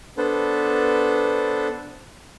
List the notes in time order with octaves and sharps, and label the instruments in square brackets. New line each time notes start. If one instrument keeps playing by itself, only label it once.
[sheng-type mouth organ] B3 D4 A4 B4 C5